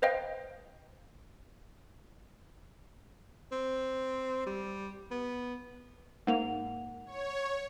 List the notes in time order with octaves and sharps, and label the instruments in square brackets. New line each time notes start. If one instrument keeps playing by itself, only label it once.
[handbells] B4 C5 D#5 F5 G5
[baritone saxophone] C4
G3
B3
[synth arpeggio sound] G#2 A#3 [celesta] F#5 F7
[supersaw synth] C#5